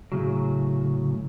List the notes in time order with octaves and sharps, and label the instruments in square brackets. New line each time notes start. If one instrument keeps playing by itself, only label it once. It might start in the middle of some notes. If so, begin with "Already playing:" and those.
[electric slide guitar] A2 C#3 F#3